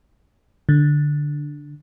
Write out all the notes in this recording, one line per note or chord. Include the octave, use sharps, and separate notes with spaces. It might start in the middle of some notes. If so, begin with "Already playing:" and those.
D3